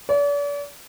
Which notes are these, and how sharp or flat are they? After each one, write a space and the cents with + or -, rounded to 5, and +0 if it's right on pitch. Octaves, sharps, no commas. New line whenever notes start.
D5 -40